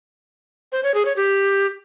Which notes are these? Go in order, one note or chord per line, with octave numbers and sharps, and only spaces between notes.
C5
C#5
G#4
C#5
G4